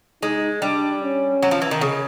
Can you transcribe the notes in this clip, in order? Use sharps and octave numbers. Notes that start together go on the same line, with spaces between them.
G#3 D#4
G3 D4
C#4
F#3
F3
E3
D#3
C#3